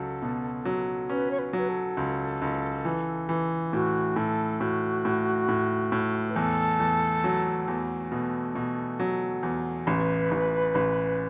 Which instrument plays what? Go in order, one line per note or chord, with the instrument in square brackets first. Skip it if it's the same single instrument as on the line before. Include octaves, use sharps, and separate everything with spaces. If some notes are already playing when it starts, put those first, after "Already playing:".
Already playing: [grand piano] C#2 F#3 [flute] A4
[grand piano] B2
F#3
[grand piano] C#4 [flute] B4
[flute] C#5
B4
[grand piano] F#3 [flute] B4
[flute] A4
[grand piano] C#2
C#2
E3
E3
[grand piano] A2 [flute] F#4
[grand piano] A2 [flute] A4
[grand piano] A2 [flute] F#4
[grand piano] A2
A2
A2
[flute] B4
[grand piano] E2 [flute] A4
[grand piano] E2
F#3
E2
[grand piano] B2 [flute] A4
[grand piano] B2
F#3
E2
[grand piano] A1 [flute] B4
[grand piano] A1
A1